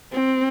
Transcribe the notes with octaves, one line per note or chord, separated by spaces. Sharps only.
C4